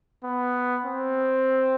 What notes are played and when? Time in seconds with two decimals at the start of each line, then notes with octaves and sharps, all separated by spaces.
0.24 B3
0.85 C4